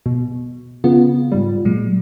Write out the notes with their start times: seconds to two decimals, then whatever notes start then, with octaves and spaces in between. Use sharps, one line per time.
0.06 B2
0.84 C#3 B3 F4
1.32 G#2 G3
1.65 A#2 F#3 G#3